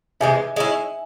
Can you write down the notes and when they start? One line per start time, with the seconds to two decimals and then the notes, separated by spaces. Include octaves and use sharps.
0.20 C3 E3 G#3 E5 G#5
0.56 G#3 C#4 E4